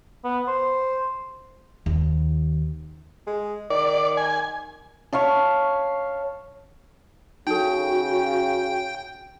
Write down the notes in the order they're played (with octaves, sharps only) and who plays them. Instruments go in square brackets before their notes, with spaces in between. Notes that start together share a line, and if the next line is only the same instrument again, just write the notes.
[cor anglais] B3
C5
[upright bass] D#2 D#3
[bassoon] G#3
[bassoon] D#3 [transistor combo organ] D5
[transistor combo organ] G#5
[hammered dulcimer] C#5 E5 F5 A5
[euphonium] C#3 [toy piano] D#4 A4 [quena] F#4 [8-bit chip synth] G5